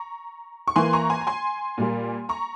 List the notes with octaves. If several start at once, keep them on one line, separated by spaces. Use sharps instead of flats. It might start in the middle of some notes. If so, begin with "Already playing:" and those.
Already playing: A#5 C#6
C#6
E3 A#3 G#5 C6
A#5 C#6
G#5 C6
A#5
G#5 C6
A#2 G3 A#3
A#5 C#6